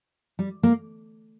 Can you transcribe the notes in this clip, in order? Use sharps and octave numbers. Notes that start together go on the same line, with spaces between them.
G3
A#3